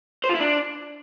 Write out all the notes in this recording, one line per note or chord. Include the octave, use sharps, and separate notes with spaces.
C5
F4
E4
D4